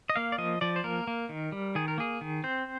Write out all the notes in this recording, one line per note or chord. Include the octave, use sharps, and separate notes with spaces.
D#5
A#3 F5
D5
F3 D#5
F3 D5
C5
A#3 A#4
A#3
D#3
G3
D#3 G#4
A#4
A#3 G#4
D#3
C4 C5